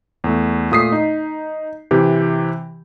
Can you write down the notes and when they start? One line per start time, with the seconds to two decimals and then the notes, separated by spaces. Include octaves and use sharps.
0.24 E2 A3
0.71 A#2 A3 D#6 B6 C7
0.92 D#4
1.91 C3 E3 G4